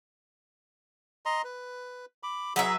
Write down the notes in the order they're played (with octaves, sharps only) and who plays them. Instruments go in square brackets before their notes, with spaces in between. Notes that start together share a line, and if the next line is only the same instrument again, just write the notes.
[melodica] D#5 A#5 C6
B4
B5 D6
[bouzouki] F#3 B4 E5 [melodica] G#4 A#5